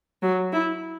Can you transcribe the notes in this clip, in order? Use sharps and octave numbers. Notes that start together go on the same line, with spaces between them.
F#3
E4